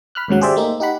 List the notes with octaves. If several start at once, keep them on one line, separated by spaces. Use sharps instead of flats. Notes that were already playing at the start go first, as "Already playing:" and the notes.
B5 F6 F#6
D#2 G#2 C#3 F#3 F#5
G4 G#4 C5 D5 E5
A3 A#3 D#4
D#4 G4 F#5 B5